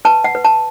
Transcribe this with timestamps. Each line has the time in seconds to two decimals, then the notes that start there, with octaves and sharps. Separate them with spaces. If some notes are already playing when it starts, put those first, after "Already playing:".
0.05 B4 A5
0.24 F#5
0.35 B4
0.45 A5